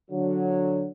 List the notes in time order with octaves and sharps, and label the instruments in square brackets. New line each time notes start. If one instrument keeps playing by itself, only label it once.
[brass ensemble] D3 F#3